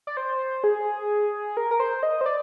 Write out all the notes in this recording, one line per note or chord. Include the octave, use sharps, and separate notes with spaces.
D5
C5
G#4
A#4
A#4
C5
D#5
C5
D5